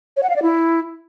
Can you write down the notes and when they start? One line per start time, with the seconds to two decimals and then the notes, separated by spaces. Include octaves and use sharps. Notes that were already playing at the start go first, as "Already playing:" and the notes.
0.17 C#5
0.23 F#5
0.30 F5
0.36 D5
0.42 E4